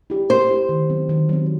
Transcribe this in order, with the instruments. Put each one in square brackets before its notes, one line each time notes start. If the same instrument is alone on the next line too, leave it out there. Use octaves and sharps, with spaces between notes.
[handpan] E4 G4
[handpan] A3 [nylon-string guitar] C5
[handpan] E4 G4
D#3
F#3 C4
D#3
F#3 C4